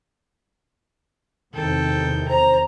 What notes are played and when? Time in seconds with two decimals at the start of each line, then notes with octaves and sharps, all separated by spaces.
1.54 E2 C3 D#3 A4 G5
2.28 C5 A#5